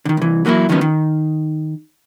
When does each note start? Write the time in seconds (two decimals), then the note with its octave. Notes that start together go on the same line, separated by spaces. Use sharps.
0.05 D3 D#3
0.17 C2 E3
0.45 E3 F#3 A#3 E4 F#4
0.69 E2 D#3 F3 F#3 B3 C#4
0.81 D#3